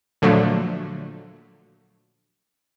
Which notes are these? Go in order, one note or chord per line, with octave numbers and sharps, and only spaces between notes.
A#2 D3 F3 F#3 A3